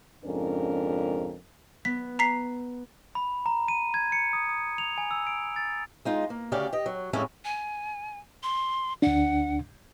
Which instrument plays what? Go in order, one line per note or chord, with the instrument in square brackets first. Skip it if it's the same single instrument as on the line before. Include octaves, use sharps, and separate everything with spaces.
[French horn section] F2 G#2 C#3 C#4 D4 A#4
[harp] B3 [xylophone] B6
[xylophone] A#5 B6 C7
[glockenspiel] B5
A#5
D#7
G#6
C#7
D#6
D#6
F7
G#5
E6
D7
A6
[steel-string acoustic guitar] G#3 D#4 F4
A#3
D2 C#3 C#4 G4 D5 F5
G4 D#5
F#3
F2 A2 G3 G#3 C#4 E4
[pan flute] G#5
C6
[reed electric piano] D2 D4 [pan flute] F#5